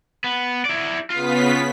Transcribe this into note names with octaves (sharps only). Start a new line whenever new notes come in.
B3
E4 D5
C#3 B3 F4 B6